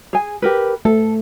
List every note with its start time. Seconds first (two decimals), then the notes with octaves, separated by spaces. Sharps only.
0.13 G#4 G#5
0.42 G4 A#4 B4
0.85 A3 A4